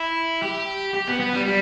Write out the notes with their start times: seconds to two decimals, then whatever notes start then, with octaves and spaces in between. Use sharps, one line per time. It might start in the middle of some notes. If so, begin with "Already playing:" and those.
Already playing: E4
0.42 G4
0.94 G4
1.08 B3
1.20 B3
1.33 G3
1.45 G3